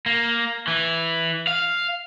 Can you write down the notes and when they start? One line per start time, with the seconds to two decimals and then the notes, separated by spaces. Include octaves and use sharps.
0.06 A#3
0.68 E3
1.47 F5